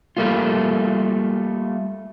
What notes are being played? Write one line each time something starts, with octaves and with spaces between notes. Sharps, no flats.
G3 A3 A#3 F4